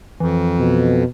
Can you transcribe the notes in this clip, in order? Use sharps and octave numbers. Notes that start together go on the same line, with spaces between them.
F2 E3
B2